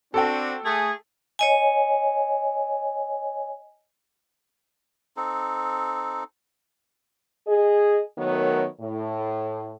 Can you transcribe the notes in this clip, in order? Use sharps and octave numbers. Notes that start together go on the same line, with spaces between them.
C4 D4 F#4 A4 G5
A3 G#4
C#5 D#5 G#5
C4 D#4 A4
G#4 D#5
D#3 F#3 A3 B3 A#4 C#5
A2